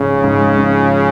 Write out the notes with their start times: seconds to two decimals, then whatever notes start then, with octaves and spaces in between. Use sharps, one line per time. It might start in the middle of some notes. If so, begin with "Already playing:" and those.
Already playing: G#2 C#3 F3 C#4
0.24 G#2
0.57 F3 C#4